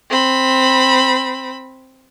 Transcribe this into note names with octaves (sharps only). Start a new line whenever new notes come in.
C4 B5